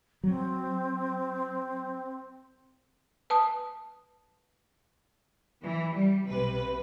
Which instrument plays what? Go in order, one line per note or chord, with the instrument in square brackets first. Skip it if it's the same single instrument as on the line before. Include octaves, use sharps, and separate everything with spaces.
[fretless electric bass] F#3 [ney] C4
[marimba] B4 A5 D#6
[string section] E3
G3
B1 C3 B4